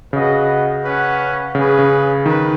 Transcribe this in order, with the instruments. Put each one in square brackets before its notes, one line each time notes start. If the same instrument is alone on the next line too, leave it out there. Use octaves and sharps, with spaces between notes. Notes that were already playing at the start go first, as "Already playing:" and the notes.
[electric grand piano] C#3 [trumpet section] F#4 B4 D#5 F#5
[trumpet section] C#4 B4 F#5
[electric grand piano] C#3 [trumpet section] C#4 G#4 B4
[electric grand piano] C#3
[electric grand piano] D#3 [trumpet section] B4